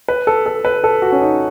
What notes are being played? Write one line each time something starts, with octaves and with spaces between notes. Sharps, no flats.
B4
A4
A4
B4
A4
F#4
C#4
D#4